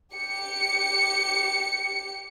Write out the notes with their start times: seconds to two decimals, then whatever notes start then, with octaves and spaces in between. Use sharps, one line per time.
0.13 G4 C#7